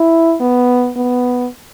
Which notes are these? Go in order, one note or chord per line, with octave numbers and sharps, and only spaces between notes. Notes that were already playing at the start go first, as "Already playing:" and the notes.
Already playing: E4
B3
B3